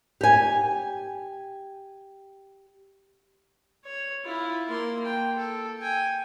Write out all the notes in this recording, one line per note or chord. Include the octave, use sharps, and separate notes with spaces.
G4 G#5
C#5
E4 F4
A#3 C6
G5
A4
G5 G#5